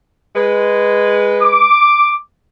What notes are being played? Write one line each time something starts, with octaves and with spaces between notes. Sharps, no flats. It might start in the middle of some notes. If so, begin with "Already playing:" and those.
G#3 B4
D6